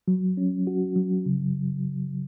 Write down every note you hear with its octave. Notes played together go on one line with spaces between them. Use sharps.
F#3
C#4
F#4
F#3
C#3